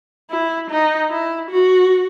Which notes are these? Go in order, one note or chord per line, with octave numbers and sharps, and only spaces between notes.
E4
D#4
E4
F#4